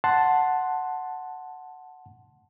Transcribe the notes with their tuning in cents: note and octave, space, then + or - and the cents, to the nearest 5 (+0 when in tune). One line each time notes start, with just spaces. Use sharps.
F#5 +0 A5 +0 C6 +0